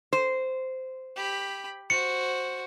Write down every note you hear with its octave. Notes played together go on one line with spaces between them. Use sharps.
C5
G4 B5
F#4 C5 C#7